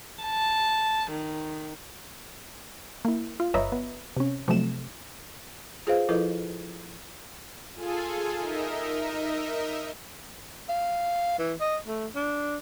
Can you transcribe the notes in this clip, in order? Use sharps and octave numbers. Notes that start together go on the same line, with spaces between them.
A5
D#3
A#3 E4
F4
G1 B4 C#5 D#5 E5 A#5
B3
C3 C#4
C3 F3 F#3 A3 E7
F4 G#4 B4 C5 D#5 F5
F3 E4 F4 A4 B4 D#5
F4 G#4 A4 G#5
D#4 A#4 D#5 E5
F5
E3
D#5
A3
D4